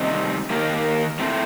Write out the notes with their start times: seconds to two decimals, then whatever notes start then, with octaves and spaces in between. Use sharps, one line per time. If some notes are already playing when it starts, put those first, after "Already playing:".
Already playing: C3 D#3 G3 C4 D#4
0.50 D#3 A#3 D#4 G4 A#4
1.19 A2 A3 C4